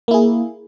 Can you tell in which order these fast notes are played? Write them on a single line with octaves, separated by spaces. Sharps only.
A#3 E4 G#4